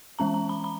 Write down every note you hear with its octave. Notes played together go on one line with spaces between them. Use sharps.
E3 G#3 C#4 A#5
A#5
B5
B5